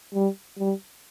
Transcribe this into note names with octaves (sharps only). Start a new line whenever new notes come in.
G3
G3